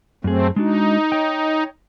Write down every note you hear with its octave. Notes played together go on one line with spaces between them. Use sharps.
F#2 A3 C4 G#4
G#3 D4 D#4 F#4
C#5 G5